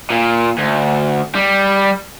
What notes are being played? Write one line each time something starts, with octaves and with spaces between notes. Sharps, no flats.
A#2
D2
G3